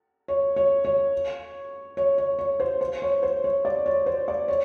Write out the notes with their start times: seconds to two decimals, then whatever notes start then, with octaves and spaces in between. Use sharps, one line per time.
0.28 C#5
0.56 C#5
0.85 C#5
1.97 C#5
2.18 C#5
2.39 C#5
2.60 C5
2.81 C5
3.02 C#5
3.23 C5
3.44 C#5
3.65 D5
3.86 C#5
4.06 C5
4.28 D5
4.48 C#5